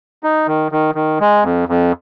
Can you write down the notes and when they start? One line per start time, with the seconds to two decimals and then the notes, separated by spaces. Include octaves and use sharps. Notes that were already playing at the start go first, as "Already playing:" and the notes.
0.23 D#4
0.47 D#3
0.72 D#3
0.95 D#3
1.20 G#3
1.44 F2
1.69 F2